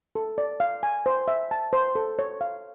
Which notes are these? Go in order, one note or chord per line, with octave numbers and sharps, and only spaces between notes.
A4
D5
F5
G#5
C5
E5
A5
C5
A4
C#5
F5